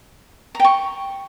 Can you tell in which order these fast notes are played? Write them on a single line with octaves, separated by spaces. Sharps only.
A#5 G5 C#6